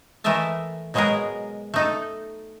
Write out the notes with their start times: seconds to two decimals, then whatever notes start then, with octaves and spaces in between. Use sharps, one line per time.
0.24 E3 A3 A#4 D#5 E5 A5
0.94 B2 F#3 G#3 B3 G#4 A#4
1.74 A3 D#4 A4